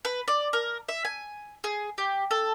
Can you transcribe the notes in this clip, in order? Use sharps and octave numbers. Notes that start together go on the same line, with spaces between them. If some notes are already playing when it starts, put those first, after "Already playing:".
B4
D5
A#4
E5
G#5
G#4
G4
A4